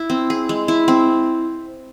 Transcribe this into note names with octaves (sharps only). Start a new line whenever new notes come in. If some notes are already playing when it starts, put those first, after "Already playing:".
Already playing: E4
C4
G#4
G#3
E4
C4